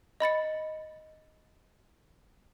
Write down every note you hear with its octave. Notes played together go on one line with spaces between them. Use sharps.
D#5 B5 A6 C#7